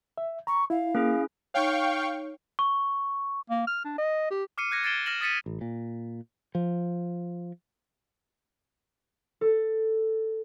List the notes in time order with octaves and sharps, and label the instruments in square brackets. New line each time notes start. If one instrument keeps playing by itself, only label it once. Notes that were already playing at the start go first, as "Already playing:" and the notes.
[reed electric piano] E5
[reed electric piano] A#5 [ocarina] C#6
[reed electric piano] E4 [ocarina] F5
[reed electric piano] A#3 [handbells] C#4 E4 G#4
[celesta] D#4 C#5 [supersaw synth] F5 G5 C#6
[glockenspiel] C#6
[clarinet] A#3
F6
D4
D#5
G4
[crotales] D6 F6 C7 C#7 D#7
F#6 G#6 A#6 C#7
G#6 A6 C7 D7 E7 G7
F6 A#6 E7 F#7
D#6 A6 B6 C#7 D#7
[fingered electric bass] A1
A#2
F3
[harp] A4